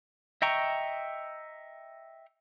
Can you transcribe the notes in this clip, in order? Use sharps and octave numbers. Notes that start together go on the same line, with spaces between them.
D#5 E5 G5 A#5 C#6